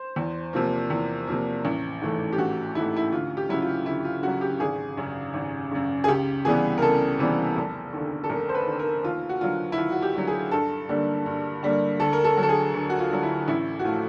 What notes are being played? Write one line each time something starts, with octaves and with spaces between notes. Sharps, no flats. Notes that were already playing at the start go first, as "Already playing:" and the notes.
Already playing: C5
E2
C3 F3 A#3
E2
C3 F3 A#3
A1
G#2 E3 A3
G4
A1 F#4
G#2 E3 A3 E4
E4
D2 F4
G4
C#3 F#3 E4
F4
D2 E4
F4
C#3 F#3 F#4
G4
G#1 G#4
F#2 C#3
G#1
F#2 C#3
G#4
C#2 G4
C3 E3 G3 B3 G#4
A#4
C#2 A4
C3 E3 G3 B3
F1
D#2 D3
A4
F1 A#4
C5
B4
D#2 D3
A#4
D#2 F4
F#4
D3 F#3 F4
E4
D#2 F4
F#4
G4
D3 F#3
G#4
G2 A4
D3 G3 A#3
G2
D3 G3 A#3
D2 A4
A#4
A4
D3 F#3
A4
G#4
D2
F#4
F4
D3 F#3
E4
A1 E4
F#4
A2 F3 A3 F4